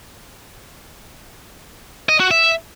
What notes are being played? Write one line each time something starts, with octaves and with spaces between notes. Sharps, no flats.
D#5
F#4
E5